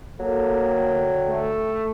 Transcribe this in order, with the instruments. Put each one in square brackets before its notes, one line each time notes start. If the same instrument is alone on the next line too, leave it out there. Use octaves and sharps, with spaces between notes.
[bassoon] F#3 [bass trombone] A#3 [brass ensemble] A4
[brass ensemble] D2 D3 G5
[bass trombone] A3